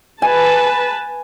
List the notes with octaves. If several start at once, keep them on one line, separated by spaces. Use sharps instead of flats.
B4 G#5 A5